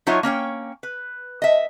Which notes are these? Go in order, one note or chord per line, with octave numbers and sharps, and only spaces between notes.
F#3 D#4 F4 C#5 E5
A#3 C#4 C#5 G5
B4
D#5 E5